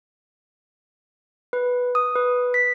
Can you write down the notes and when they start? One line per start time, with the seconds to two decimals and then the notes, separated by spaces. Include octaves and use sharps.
1.53 B4
1.95 D#6
2.16 B4
2.54 B6